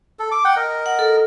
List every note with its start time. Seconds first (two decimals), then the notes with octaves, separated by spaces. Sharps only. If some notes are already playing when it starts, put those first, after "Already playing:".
0.19 A4
0.32 D6
0.45 F#5 G5
0.56 A#4 D#5
0.86 F#5
0.99 A4